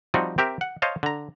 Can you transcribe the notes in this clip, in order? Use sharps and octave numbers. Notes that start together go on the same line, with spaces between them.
F3 G3 C4 D#4 F#4
C4 G4 A#4 E5
F#5
C5 C#5 D#5 F5 A5
D3 A#5